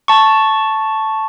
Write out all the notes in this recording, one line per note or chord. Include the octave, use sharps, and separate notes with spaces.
A5 C#6